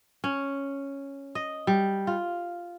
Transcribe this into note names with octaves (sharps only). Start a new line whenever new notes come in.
C#4
D#5
G3
F4